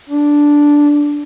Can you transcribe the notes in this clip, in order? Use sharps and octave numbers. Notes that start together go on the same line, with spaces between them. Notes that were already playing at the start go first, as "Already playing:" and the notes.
D4